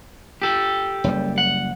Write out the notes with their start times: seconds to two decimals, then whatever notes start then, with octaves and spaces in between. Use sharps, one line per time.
0.42 G4 A4
1.04 F#1 G3
1.38 F#5